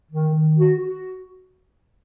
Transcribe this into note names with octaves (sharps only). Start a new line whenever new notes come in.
D#3
D#3
F#4
F#4